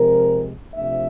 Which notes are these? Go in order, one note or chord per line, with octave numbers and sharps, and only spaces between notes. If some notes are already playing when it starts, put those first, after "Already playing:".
Already playing: C3 F3 G#3 C4 A#4
C3 F3 A3 D4 E5